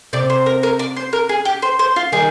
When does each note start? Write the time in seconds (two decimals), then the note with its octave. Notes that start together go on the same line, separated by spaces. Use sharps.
0.13 C3 D5
0.30 C5
0.46 A#4
0.63 A#4
0.79 D5
0.96 C5
1.13 A#4
1.29 G#4
1.45 G4
1.62 C5
1.79 C5
1.96 F4
2.12 D#3 G3 G#4